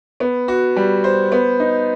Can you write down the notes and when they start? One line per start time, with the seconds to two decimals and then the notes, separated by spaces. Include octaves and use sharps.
0.20 B3
0.48 F#4
0.76 G3
1.04 C5
1.32 B3
1.60 D#4